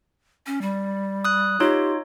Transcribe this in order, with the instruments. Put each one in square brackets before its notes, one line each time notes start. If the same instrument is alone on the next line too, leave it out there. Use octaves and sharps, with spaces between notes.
[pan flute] C#4
G3
[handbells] D#6 F#6
[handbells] D#4 F4 C#5 [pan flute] G4